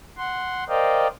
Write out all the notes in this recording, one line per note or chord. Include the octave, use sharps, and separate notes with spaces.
F#5 C6
A#4 C5 D5 D#5 F5 G5